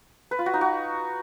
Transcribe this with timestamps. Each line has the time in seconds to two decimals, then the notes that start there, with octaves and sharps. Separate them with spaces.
0.31 B4
0.39 F4
0.46 F#4
0.54 D#4
0.61 F#4